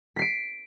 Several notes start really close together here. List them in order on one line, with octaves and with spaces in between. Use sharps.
B6 C7 D7